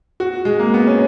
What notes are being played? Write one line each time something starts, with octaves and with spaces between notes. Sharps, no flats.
F#4
G#3
A#3
B3
C#4